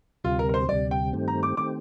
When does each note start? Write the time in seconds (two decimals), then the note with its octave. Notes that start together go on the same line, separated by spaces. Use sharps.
0.24 D2 C3 G3 F4
0.39 A#4
0.49 A#4
0.54 C5
0.68 D2 C3 G3 D5
0.91 G5
1.13 G2 D#3 A3 C4 G4
1.28 A#5
1.43 D6
1.57 D#3 A3 C4 G4 D6